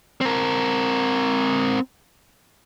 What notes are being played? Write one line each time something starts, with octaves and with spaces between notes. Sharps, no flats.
C4 A#4